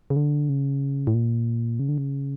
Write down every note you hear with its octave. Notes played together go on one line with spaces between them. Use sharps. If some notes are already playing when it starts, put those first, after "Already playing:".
C#3
D3
C#3
A2
A#2
C#3
D3
C#3